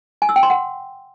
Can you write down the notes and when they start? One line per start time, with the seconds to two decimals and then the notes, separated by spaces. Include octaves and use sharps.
0.22 G#5
0.29 E6
0.36 G5
0.43 C6
0.50 F#5